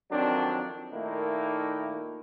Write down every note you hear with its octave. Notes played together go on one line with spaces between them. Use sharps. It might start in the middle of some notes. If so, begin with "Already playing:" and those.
F2 D#3 F#3 C4 D4
A#2 D#3 A3 A#3 D#4 E4